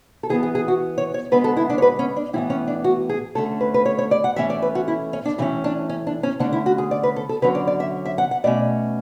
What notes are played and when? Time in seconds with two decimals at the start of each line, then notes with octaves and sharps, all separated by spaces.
0.23 A4
0.30 E3 B3 G#4
0.43 G#4
0.55 G#4
0.68 F#4
0.98 C#5
1.14 C#5
1.32 D3 G#3 B3 B4
1.44 A4
1.57 E4
1.70 D4
1.78 C#5
1.82 B4
1.99 C#4
2.16 D4
2.33 A2 E3 B3 E4
2.50 C#4
2.68 D4
2.84 F#4
3.09 G#4
3.35 D3 A3 C#4 A4
3.61 B4
3.74 B4
3.86 C#5
3.98 C#5
4.11 D5
4.24 F#5
4.36 A2 E3 A3 C#4 E5
4.50 D5
4.62 B4
4.75 F#4
4.88 E4
5.13 C#4
5.25 D4
5.38 A2 E3 A3 C#4 E4
5.64 D4
5.89 C#4
6.07 D4
6.23 C#4
6.39 D3 A3 C#4 D4
6.53 E4
6.66 F#4
6.78 G#4
6.91 D5
7.03 B4
7.16 A4
7.29 A4
7.42 D3 F#3 C#4 B4
7.55 D5
7.67 D5
7.80 E5
8.05 E5
8.18 F#5
8.31 F#5
8.44 B2 A3 C#4 D5